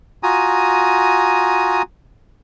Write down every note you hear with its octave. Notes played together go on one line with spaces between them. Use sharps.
F4 F#4 G#5 A#5 D#6